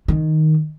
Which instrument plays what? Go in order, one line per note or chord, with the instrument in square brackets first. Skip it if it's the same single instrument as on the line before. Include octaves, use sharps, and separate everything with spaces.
[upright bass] D#3